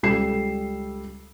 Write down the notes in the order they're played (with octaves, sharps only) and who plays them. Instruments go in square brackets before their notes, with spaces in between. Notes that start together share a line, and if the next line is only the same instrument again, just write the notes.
[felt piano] C#2 G3 A4 C7 E7